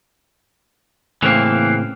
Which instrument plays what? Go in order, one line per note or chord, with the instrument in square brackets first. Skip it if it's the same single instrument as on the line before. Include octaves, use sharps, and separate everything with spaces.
[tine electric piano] A2 C#3 C4 [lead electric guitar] E3 A#3